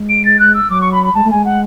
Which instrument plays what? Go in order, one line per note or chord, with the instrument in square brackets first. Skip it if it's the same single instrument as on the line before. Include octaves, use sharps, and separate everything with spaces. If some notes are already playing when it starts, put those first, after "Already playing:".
Already playing: [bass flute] G#3
[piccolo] D7
A6
F#6
E6
[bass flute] F#3 [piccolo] D6
[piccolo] C#6
B5
B5
[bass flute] G#3 [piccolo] A5
[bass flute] A3
[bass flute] G#3 [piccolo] G#5
[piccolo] F#5